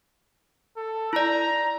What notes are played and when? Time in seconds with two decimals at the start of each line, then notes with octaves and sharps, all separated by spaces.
0.77 A4
1.13 E4 D5 A#5